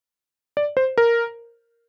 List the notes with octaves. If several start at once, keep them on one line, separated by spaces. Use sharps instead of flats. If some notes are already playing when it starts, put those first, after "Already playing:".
D5
C5
A#4